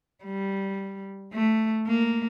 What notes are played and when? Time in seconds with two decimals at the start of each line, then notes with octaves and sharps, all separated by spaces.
0.24 G3
1.33 A3
1.87 A#3